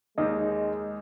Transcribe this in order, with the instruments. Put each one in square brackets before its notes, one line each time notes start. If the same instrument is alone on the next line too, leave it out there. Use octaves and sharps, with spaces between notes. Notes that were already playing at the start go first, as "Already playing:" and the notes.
[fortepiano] D#2 D#3 [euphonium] G#3 [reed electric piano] D#5